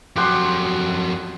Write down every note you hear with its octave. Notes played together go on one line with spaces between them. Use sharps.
F2 F#3 G4 F#5 C6